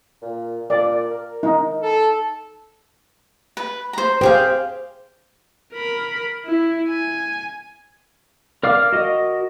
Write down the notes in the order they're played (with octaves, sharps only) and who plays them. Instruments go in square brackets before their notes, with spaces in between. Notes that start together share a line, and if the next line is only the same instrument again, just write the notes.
[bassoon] A#2
[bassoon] A#2 [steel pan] D5
[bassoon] A#4
[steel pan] D#4
[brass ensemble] A4
[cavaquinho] B4
C5 A#5
[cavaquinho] G4 G#4 F5 [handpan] C5
[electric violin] A#4 B5
E4
G#5
[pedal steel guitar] A#4 D5 F5 D6 F6
F#4 A#4 D#5